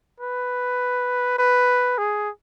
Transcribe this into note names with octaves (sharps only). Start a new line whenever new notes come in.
B4
B4
G#4